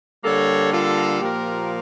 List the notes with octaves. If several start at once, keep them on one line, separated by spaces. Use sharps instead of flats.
D3 G3 A#3 A4 C#5
F4 A4
A#2 F3 A#3 G4 A#4